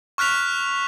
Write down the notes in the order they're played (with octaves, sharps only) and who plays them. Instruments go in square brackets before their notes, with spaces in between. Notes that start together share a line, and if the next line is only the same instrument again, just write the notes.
[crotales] C#6 F6 F#6 B6 F7